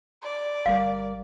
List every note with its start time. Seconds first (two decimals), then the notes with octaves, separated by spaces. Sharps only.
0.23 D5
0.66 G1 G3 A#4 F5